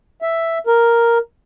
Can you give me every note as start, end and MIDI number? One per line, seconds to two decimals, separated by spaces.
0.22 0.58 76
0.67 1.18 70